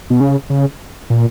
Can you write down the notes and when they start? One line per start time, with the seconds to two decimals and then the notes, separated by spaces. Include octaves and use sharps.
0.10 B2
0.20 C#3
0.50 C#3
1.10 A#2